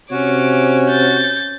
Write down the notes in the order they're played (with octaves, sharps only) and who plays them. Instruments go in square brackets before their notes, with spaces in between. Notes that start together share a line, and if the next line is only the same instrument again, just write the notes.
[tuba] C3 [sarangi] C#4 [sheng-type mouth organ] F#4 [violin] D6
[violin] G6 A6